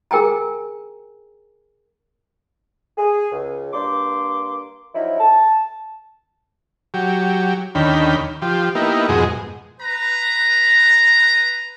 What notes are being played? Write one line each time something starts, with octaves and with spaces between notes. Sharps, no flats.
G#4 A#4 G5 G#5 A#5
G#4
C#2
G2 A#3 C6 D6
F3 F#3 D#4 E4
A5
F#3 G4
D#2 D3 D#3 C#4 G5 B5
F3 G4
A#3 B3 D#4 E4 G4
F2 G#2 B2 G#3 F#4 G#4
B4 A#5